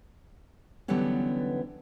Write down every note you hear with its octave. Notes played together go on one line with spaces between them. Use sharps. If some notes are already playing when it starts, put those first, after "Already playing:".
D3 E3 F#3 G3 B3 C#4